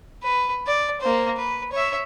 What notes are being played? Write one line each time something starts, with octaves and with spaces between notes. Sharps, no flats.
B4
D5
A#3 C5
B4
C#5 E5